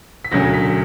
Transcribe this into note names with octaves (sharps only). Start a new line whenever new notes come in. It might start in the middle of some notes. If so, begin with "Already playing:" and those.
B6
E1 D2 C#3 F#3 A#6
B6